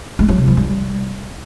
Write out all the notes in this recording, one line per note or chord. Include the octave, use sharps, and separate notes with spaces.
G#3
F#3
C3
F3
G3